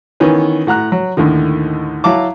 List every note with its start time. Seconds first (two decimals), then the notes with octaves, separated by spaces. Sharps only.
0.20 D#3 E3 B3 C#4
0.67 A2 F#5 A#5 F#6
0.92 F#3
1.17 D#2 A2 D3 D#3
2.04 F#3 E4 F5 A5 D6